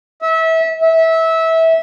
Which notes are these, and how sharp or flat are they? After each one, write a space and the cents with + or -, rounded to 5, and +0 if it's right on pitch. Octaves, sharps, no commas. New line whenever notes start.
E5 -25
E5 -20